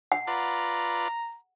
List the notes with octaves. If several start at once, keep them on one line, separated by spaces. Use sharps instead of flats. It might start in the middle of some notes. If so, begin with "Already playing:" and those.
F#5
F4 B4 D5 A#5